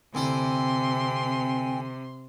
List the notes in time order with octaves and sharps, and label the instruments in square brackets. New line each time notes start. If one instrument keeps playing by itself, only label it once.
[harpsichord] D2 E4 A4 [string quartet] C3 [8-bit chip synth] C4 G5 G#5 [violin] C6